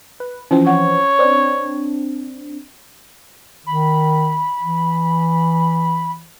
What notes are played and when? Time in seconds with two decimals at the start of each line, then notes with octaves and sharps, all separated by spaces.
0.20 B4
0.51 E3 F3 C4 C#4
0.67 C#5 F#5
1.19 C4 D4
3.66 D#3 B5
4.62 E3